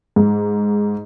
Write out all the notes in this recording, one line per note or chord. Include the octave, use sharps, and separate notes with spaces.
G#2